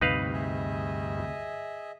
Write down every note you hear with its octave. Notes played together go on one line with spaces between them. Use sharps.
D2 G2 C3 D#4 B4 F5
G#4 D#5 E5